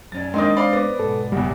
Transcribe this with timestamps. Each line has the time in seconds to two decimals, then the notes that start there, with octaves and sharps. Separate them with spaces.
0.12 F#2 C#4 D5 A6
0.34 D#3 G#3 A#3 C4 D4 D#4 D#5
0.57 C5 D5 F5 B5
0.73 B3 D5
0.99 G#2 B2 A4
1.32 F#1 E2 G3 G4 F#5